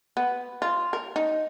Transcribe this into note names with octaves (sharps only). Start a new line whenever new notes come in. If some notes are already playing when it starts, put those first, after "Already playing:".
B3
F4
A#4
D#4